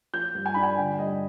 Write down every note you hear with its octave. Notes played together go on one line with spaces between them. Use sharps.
F3 G6
G2
G#5
D4 B5
G#5
D3 G5
G2 D#5